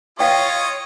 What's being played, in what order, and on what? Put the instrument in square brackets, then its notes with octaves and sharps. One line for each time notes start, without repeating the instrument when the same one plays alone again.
[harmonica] F4 D#5 [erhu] C#5 [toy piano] F5 G5 C#6